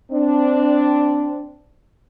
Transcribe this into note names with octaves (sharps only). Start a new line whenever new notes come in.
C4 D4